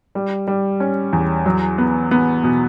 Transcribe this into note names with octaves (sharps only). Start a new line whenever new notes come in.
G3
G3
C#4
E2
F#3
B3
B3
B2